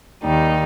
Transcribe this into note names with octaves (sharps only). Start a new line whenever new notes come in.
D#2 D#3 G3 D#4